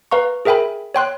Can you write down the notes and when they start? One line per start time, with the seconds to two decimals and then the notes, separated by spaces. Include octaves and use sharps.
0.11 B4 F5 A#5 C#6
0.45 G#4 A#4 E5 G5 G#5 B5
0.95 C#5 G5 C6 F#6